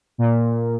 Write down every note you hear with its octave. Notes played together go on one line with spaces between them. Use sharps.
A#2